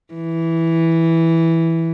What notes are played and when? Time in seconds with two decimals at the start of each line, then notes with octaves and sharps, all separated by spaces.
0.14 E3